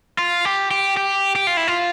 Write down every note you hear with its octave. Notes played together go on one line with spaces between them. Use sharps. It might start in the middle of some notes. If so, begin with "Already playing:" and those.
F4
G4
G4
G4
G4
F4
E4
F4